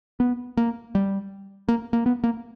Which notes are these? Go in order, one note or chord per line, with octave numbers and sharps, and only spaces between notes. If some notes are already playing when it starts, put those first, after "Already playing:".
B3
A#3
G3
A#3
A#3
B3
A#3